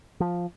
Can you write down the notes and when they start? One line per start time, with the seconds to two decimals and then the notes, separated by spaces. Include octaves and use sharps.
0.20 F3